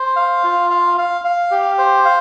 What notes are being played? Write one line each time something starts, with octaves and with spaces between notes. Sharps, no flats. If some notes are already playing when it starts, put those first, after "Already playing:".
Already playing: C5
F5
F4
F5
F5
F5
G4
C5
F5